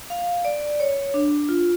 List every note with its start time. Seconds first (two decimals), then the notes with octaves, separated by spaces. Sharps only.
0.10 F5
0.45 D5
0.80 C#5
1.14 D4
1.49 F4